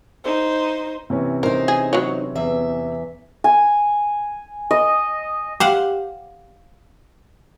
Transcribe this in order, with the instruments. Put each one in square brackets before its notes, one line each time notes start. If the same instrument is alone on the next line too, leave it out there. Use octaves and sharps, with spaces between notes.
[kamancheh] D#4 C5
[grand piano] C3 E3 C#4
[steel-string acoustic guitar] D#4 C5 [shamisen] A#4
[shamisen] G#4
F#3 B4 C#5
[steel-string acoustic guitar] E2 E5
[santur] G#5
D#5
[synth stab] G4 [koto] C5 F5 F#5